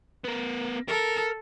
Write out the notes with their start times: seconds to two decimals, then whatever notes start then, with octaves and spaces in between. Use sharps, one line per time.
0.24 B3 A#4
0.88 A4 A#4